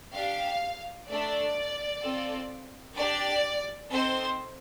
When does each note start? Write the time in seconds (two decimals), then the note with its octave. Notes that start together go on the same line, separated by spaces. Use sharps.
0.13 D4 G4 F5
1.08 A3 D4 A4 D5
2.02 C4 F4 A4
2.97 D4 G4 D5
3.92 C4 D#4 A4 C5